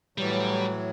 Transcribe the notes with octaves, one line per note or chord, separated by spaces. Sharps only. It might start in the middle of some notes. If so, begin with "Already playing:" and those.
A2 E3 F#3 G3